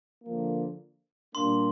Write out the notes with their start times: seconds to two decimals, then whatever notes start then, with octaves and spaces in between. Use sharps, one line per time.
0.23 D3 F3 A#3
1.34 A#2 G3 A#3 D4 C6